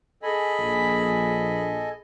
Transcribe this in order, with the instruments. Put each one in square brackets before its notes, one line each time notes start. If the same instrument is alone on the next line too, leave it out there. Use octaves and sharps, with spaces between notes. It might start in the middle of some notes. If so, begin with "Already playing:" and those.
[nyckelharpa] G#4 B5 [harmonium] A4 D#5 G#5
[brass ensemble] A#1